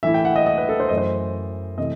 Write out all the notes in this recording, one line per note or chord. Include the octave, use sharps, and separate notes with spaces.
A2 E3 A3 E4 E5
G5
F#5
D#5
D#5
B4
A4
C5
F#2 E3 A3 D#5
C5
C3 E3 A3 D#5